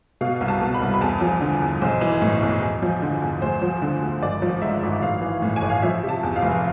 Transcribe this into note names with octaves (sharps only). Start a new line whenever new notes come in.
B2 F5
C2
A5
B2
B5
C2
B5
E2 A5
F3
D3
E2
B1 C5
E3
A2
B1
E2
F3
D3
E2
D2 C5
F3
D3
D2
G#1 D5
F3
G#2 E5
G#1
A1 F5
E3
A2
G#5
A1
F5
F3 E5
C3
A5
E2
F5
F1